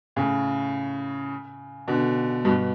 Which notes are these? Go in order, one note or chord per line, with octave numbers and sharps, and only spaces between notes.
A2 C#3
B2 D3
G2 B2